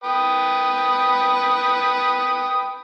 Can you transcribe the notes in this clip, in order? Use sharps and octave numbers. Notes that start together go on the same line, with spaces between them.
B4 G5 D#6